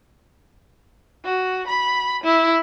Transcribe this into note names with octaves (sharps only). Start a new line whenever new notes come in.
F#4
B5
E4